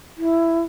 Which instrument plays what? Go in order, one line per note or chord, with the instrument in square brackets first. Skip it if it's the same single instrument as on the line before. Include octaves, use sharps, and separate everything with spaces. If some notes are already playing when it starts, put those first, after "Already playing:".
[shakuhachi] E4